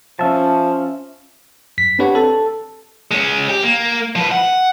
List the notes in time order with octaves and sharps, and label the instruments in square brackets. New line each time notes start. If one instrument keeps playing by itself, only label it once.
[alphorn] F3 [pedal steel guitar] C#4 E5 A5
[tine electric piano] F#2 B6
C4 D4 G4 B4 C#5 F#5
A4 A5
[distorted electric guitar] G#3 C#4
G4
A#3
F3 B4
F#5